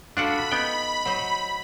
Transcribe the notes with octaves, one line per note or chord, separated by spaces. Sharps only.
D4 F4 F#4 A4 D5 F#5 B5
B3 D#4 G5
F#3 C5 D#5